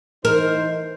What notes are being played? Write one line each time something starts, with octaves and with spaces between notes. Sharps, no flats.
E3 D#4 A#4 C5